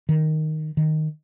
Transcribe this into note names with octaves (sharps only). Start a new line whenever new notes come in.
D#3
D#3